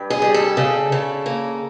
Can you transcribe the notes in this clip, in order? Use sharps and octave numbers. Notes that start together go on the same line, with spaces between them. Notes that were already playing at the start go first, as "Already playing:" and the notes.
Already playing: G2
G#4
G3
A4
C#3
C#3
A#3